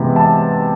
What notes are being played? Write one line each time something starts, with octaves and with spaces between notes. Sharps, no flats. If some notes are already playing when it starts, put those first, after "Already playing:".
Already playing: C3 E3 G#3 B3
A5